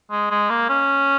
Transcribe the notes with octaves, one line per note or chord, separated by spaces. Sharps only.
G#3
G#3
A#3
C#4